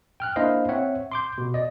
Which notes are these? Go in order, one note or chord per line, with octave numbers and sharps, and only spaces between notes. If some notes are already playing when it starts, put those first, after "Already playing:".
G5 F6 F#6
A#3 D4 E4 C5 D#5 F5
C4 C#5 E5 F#5
C6 D6 G6
B2
D5 D#5